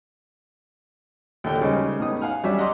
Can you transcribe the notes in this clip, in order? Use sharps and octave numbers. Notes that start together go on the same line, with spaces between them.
D#2 A#2 D3 A3 A4 G5
C#3 G3 G#3 C#4 D#4 C5
A2 B3 D#4 D#6
F5 F#5 G#5 F6
F#3 G3 C#4 D4 E5
D#5 F#5 A#5 C6 D6